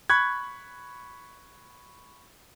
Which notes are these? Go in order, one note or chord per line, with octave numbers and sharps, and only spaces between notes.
B5 C#6 F#6 G#6